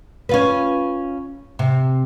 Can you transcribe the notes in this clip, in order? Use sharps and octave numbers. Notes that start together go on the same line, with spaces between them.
C#4 F4 B4
C3